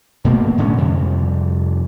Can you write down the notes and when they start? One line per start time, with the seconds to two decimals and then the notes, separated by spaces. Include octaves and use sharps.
0.24 G2 B2 A3 A#3
0.57 A2 D3 G#3 C#4
0.76 F2 C3 G3